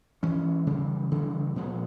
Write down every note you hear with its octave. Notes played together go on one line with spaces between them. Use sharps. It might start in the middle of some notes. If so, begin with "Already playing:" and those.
E3 G#3 C#4
C#3 E3 G3 A#3
C#3 E3 G3 A#3
A#2 F3 G#3 B3